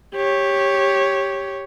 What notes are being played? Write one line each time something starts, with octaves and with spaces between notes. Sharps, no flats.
G4 C#5